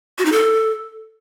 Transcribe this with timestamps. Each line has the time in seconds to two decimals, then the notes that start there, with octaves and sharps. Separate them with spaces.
0.18 F#4
0.25 D#4
0.32 A4